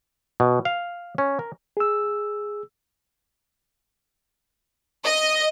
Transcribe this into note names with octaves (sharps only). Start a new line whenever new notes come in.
B2
F5
C#4
A#4
G#4 E6
D#5